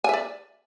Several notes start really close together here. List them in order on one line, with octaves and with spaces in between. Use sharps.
G#5 E5 D5